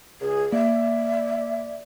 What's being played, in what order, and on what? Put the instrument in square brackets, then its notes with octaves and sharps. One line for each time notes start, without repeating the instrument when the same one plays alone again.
[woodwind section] C#2 [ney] G#4
[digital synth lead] A#3 [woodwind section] D5 [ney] E5